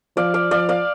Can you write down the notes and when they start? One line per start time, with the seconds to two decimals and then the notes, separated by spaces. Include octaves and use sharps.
0.17 F3 D5 F5
0.34 D5 F5
0.51 F3 D5 F5
0.69 D5 F5